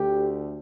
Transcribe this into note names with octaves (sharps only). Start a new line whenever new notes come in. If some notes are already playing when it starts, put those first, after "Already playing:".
Already playing: D2 D3 A3 G4